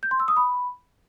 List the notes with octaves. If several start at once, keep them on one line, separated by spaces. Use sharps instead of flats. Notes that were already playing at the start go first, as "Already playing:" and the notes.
G6
C6
E6
D#6
B5